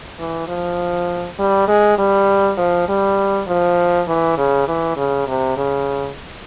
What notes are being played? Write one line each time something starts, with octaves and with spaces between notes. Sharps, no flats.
E3
F3
G3
G#3
G3
F3
G3
F3
E3
C#3
E3
C#3
C3
C#3